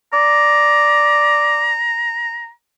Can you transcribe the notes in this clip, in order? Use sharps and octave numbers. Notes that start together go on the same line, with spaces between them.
D5 A#5